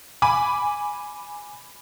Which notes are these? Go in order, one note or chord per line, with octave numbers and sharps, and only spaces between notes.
G#5 B5 D6